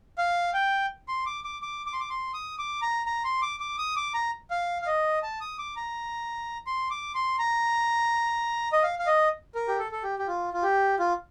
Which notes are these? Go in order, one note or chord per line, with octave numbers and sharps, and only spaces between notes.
F5
G5
C6
D6
D6
D6
D6
C6
D6
C6
D#6
D6
A#5
A#5
C6
D6
D6
D#6
D6
A#5
F5
F5
D#5
A5
D#6
D6
A#5
C6
D6
C6
A#5
D#5
F5
F5
D#5
A#4
G4
A4
A4
G4
G4
F4
F4
G4
F4